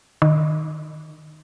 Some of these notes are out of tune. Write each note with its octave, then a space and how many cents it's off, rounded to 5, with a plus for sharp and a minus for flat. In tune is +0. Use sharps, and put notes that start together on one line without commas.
D#3 -15